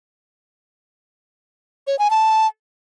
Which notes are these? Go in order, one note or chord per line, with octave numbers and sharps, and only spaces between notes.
C#5
G#5
A5